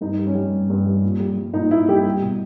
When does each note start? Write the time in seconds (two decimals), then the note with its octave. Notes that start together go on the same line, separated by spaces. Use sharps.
0.01 G2 D#4
0.19 G3
0.27 C#4
0.35 G3
0.52 G2
0.70 G2
0.86 G3
1.03 A#2
1.20 G3
1.37 G3
1.54 A#2 D#4
1.71 A#2 E4
1.88 G3 G4
2.06 G3
2.22 B2